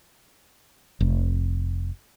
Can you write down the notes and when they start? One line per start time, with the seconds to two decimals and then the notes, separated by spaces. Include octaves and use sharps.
1.00 F1